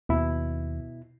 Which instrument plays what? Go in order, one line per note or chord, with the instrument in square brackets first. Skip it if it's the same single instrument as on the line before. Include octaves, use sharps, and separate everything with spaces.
[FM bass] D#2 [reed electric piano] B2 E4